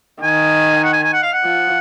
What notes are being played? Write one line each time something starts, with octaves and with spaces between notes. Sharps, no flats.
D#3 G#5
F#5
G#5
G#5
F#5
F5
F#5
F3